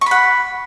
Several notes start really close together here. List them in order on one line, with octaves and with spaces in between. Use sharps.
C#6 B5 F#5